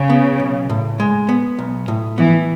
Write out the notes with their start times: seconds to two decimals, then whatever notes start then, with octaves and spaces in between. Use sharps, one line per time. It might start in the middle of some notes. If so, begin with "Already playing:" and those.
Already playing: C#3
0.10 B3
0.40 B1
0.69 A2
1.00 G#3
1.29 B3
1.59 B1
1.88 A2
2.18 E3 B3